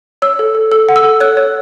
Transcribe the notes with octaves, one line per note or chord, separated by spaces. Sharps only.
C#5 E6
A4
A4
A4 E6
F#5
E6
A4
C#5 F#6
C#5